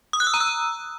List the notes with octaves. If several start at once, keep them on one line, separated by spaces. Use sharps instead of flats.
D#6
F#6
E6
A#5
E6